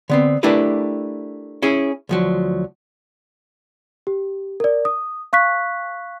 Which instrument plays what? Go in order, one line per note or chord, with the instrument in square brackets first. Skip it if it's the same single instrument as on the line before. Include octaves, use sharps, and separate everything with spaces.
[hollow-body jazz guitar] D3 B3 C4
A3 D4 E4 G4 A#4 B4
C#4 E4 G#4
D2 F3 F#3
[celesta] G4
A#4 D5
D#6
F5 C#6 F#6 B6